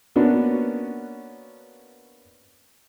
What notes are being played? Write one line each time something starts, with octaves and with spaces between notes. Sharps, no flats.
A#3 B3 C#4 D4 F#4